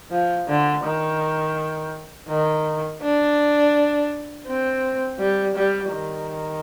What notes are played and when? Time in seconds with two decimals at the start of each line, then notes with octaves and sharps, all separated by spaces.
0.11 F3
0.48 D3
0.85 D#3
2.29 D#3
3.02 D4
4.47 C4
5.19 G3
5.55 G3
5.91 D#3